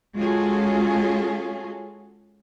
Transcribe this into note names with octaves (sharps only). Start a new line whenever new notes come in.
G#3 C#4 F4 F#4 G#4 A4